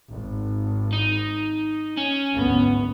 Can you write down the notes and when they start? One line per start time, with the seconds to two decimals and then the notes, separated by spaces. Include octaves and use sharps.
0.10 G#1
0.93 D#4
1.97 C#4
2.35 G#1 D2 B3